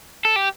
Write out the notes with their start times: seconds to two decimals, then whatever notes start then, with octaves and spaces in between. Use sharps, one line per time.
0.25 A4
0.36 G4